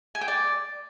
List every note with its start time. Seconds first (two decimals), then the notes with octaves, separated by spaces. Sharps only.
0.15 G#5
0.21 G5
0.28 D5